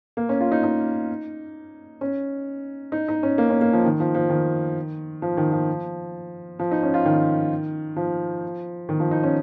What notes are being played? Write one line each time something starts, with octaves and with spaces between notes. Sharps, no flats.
A#3
C#4
F4
D#4
D#4
C#4
D#4
D#4
C#4
A#3
C#4
A#3
F3
D#3
F3
F3
D#3
F3
D#3
F3
F3
D#4
C#4
F4
D#3
F3
D#3
F3
D#4
C#4